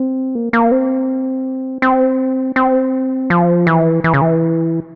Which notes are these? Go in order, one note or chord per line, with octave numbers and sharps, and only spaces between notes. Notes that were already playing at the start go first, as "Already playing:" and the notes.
Already playing: C4
A#3
A#3
C4
C4
C4
F3
E3
E3
C#3
E3